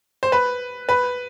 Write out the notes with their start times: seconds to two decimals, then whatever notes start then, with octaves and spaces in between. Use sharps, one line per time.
0.23 C5
0.32 B4
0.89 B4